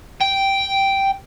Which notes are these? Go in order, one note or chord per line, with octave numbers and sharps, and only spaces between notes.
G5